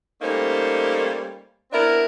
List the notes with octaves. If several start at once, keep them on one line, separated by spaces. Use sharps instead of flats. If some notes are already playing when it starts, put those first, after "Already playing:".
G3 A3 A#3 C#4 D#4 C5
B3 C4 D4 E4 A#4